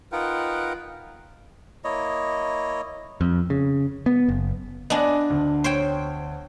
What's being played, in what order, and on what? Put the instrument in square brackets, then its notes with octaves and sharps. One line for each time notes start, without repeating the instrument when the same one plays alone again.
[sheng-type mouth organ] D#4 F4 A#4 B4 F#5 G5
[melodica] A#3 E4 C#5 D#5
[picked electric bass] F2
C#3
B3
F#1
[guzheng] B3 D4 [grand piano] D#5 G#5 A#6
[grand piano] D2
[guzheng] C5 C#5 G5